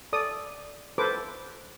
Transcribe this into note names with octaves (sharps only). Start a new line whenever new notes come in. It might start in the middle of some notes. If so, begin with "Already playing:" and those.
A4 D5 D#6
A4 B4 C5 D6